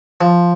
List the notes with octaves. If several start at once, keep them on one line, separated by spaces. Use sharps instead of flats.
F3